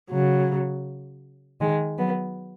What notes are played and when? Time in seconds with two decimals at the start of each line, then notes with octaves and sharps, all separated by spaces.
0.11 C#3 F#3
1.60 D#3 G#3
1.98 F#3 B3